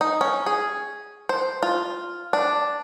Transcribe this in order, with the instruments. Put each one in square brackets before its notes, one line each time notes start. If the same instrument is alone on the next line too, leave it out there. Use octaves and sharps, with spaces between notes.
[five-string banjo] D#4
C#4
G#4
C5
F4
D4